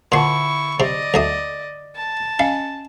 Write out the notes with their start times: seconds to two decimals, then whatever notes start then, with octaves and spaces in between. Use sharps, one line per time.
0.12 A#2 D3 E4 F#5 A5 C6 C#6
0.80 C3 D5 D#5
1.14 D2 A3 D#6
1.96 A5
2.39 C#4 D#5 F5 G#5